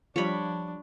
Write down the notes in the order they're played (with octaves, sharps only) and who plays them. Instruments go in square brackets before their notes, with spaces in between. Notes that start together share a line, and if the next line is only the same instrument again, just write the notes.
[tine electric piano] F3 [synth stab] G3 F4 [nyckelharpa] D4 [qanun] C#5 B5